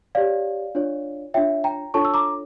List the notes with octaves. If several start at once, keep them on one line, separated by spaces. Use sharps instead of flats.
G4 C#5 D5 F5
D4 F4 C#5
D4 F4 C#5 E5 G5
G5 A#5
D4 F4 A4 C#5 A5 C#6
E6
A#5 D6